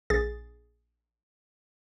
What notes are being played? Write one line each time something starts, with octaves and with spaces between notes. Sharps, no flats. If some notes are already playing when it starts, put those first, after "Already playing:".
A#1 G#4 A6